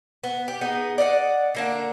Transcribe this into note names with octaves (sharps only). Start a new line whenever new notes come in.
B3
G4
B3 D#4 G#4
D5 D#5 F5 F#5
D3 A#3 D4